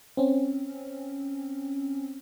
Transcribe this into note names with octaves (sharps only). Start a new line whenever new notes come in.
C4 C#4